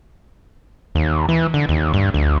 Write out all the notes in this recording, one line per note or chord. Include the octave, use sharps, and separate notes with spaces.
D#2
E3
D3
D#2
G2
D2